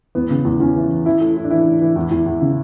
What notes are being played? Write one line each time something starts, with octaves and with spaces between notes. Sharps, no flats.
E2 B3
C#3
E2
E2 C#4
E3
E3
E3 E4
A2
A2
D4
E3 E4
A2
E3
E2
E2
E2
C#3